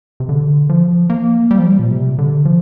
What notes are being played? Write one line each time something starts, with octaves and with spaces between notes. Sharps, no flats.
C3
D3
F3
A#3
G3
F3
G3
A#2
C3
D3
F3